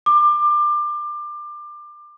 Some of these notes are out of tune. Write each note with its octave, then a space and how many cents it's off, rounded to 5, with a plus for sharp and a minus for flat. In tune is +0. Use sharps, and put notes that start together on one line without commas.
D6 +25